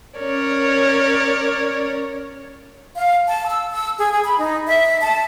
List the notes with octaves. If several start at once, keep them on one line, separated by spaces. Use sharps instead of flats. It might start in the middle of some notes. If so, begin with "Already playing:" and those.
C#4 A#4 C#5 D5
F5
A5
E6
E6
G#4
G#4
B5
D#4
E5
A5